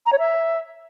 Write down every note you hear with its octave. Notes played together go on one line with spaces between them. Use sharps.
A#5
C#5
E5